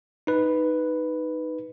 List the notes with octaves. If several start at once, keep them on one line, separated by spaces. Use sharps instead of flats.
D#4 B4